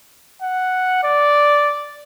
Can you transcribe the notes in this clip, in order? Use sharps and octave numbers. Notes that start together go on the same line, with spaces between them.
F#5
D5